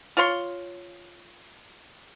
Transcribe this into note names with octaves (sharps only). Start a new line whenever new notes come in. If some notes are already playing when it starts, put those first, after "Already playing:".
F4 C#5 C6